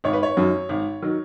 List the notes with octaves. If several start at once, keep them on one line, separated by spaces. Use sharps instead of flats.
G#1 C#5
B4
C#5
F#2 D#3 F#3
G#1
D#3 F#3